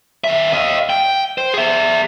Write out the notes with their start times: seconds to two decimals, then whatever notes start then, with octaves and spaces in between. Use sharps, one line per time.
0.24 D#3 E5
0.53 D#5 F5
0.90 G5
1.38 C5
1.54 G#4 E5